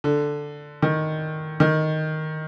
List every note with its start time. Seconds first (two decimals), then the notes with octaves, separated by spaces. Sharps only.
0.04 D3
0.82 D#3
1.60 D#3